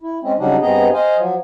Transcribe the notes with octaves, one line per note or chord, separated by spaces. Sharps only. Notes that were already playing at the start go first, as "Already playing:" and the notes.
E4
G#3 C4 C#4
C#3 F#3 G3 D4 D#4
G2 B3 C4 G#4 D#5 A#5
C5 D#5 F5 G#5
F3 F#3